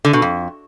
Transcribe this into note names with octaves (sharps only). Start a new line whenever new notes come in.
D3
B2
F2